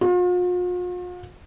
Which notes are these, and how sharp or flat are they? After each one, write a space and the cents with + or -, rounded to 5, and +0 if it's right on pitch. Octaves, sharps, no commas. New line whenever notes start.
F4 +45